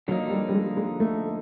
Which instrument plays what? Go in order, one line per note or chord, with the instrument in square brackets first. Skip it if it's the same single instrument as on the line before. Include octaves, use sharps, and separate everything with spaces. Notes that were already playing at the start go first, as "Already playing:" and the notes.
[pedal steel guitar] D3 F3 A#3 D#4 [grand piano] F#3
[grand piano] G3
G3
G#3
G#3
A3